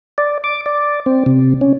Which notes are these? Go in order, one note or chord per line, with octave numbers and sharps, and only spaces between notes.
D5
D6
D5
C4
C3
C#4